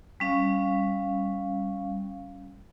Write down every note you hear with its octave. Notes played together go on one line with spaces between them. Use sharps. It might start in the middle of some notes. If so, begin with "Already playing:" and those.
G3 C#4 F5